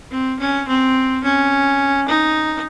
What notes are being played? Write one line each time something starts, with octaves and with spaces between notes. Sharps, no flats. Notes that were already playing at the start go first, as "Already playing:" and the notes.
C4
C#4
C4
C#4
D#4